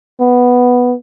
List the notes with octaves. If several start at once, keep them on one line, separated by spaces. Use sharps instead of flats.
B3